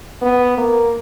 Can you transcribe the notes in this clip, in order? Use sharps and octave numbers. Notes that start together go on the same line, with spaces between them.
B3
A#3